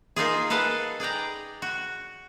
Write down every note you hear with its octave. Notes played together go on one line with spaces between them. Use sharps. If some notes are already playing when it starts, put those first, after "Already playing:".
A#3 D#4 F4 G#4
G#4 A4 B4 F5 F#5
G#4 D5 G5 A#5
F#4